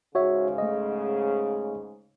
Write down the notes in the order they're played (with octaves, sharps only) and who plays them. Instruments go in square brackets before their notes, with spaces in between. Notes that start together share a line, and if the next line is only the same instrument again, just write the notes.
[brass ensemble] G#2 C#3 [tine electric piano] F#4 C#5 E5
[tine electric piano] A3 D#5